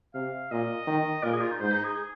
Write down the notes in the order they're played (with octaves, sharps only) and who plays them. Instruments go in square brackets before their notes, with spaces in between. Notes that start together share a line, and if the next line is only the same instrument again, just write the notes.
[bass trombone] C3 [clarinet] F5
[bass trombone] A#2 [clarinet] D#5
[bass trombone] D#3
[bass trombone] A#2 [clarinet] A#4
[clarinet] G#4
F4
D#4
[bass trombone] G#2 [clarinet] C5
[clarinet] D#4
G#4
G#4